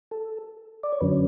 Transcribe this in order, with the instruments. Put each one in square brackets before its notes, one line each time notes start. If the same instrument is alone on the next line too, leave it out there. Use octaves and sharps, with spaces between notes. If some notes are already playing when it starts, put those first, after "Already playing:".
[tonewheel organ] A4
D5
C#5
F#2 D3 F#3 C#4 B4